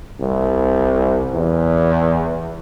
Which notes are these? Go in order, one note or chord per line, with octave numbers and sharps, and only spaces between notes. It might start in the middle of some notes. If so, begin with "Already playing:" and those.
C2
E2